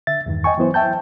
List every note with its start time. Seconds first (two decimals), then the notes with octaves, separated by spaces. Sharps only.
0.07 D3 E5 A6
0.26 E2 G2 D#3
0.44 D#5 G5 G#5 C#6
0.58 E3 F#3 B3 E4 C5
0.74 E5 G5 A5 G6